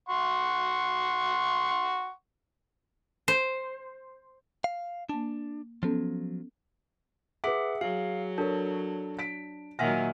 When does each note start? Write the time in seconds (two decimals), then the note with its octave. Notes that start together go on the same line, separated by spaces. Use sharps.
0.09 F#5 C6 C#6
3.28 C5
4.64 F5
5.09 A#3 D4 A5
5.83 F3 F#3 B3 C#4 A4
7.44 G#4 B4 E5 F#5 D6
7.81 F#3 G#4 F5
8.38 D4 A4 A#4 C#5
9.19 B6 D7
9.79 A#2 D#3 F#3 E5 F#5 G#5 F6 A#6